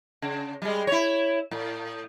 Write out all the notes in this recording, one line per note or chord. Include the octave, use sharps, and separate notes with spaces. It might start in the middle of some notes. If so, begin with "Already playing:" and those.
C#3
G3 G#3
E4 C#5
A2